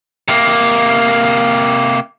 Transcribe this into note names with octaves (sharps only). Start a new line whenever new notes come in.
C3 A#3